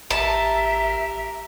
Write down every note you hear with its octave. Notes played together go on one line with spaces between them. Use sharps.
A1 G4 A#4 E5 A5